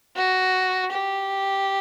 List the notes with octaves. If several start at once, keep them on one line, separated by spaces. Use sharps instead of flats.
F#4
G4